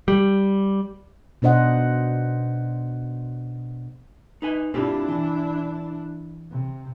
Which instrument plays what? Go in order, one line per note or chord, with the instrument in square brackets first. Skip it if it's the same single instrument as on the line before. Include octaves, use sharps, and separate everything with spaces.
[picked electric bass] G3
[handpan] B2 D4 C5 D#5 F#5
[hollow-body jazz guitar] D#4 B4 G#5
[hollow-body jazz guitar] C4 F4 G4 [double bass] D4 E4
[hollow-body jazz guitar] E3
[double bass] C3